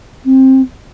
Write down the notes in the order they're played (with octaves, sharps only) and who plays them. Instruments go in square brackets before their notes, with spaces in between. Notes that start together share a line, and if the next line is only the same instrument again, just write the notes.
[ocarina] C4